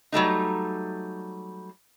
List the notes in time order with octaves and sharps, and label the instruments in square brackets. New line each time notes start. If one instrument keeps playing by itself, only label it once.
[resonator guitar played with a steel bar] F#3 G3 A3 D#4